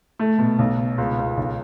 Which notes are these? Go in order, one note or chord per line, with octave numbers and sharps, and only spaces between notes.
A3
B2
B1
B2
C#2
C#2
B1